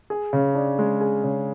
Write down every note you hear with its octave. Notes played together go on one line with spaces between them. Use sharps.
G#4
C#3
D4
G#3
G#4
C#3